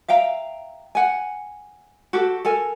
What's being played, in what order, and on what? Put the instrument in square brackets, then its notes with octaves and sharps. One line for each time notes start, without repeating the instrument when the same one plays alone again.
[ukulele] E5 F5 G5 A#5
F#5 G#5
F#4 G4 A4
A4 A#4 G#5